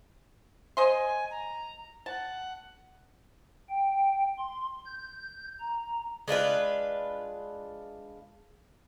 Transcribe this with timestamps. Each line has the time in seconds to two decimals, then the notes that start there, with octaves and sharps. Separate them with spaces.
0.77 C5 D#5 G#5 C6
1.31 A#5
2.06 F#5 A5
3.69 G5
4.38 C6
4.85 G6
5.60 A#5
6.28 G#3 D4 F4 B4